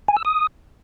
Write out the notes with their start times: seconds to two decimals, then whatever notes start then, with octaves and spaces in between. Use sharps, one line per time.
0.08 G#5
0.17 E6
0.25 D#6